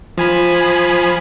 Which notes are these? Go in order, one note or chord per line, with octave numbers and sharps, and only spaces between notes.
F3 G#5 B5